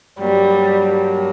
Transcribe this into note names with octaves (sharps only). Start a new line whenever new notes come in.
G2 F#3 G3 A#3